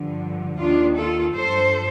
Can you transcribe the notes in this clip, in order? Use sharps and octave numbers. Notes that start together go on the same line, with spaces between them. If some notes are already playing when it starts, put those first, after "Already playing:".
Already playing: G2 D3 F3
D#2 D#3 D4 F4
F4 A4
G2 F3 A4 C5